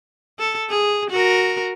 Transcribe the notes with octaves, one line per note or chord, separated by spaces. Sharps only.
A4
G#4
F#4 A#4